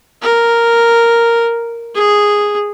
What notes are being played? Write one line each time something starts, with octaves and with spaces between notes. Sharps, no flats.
A#4
G#4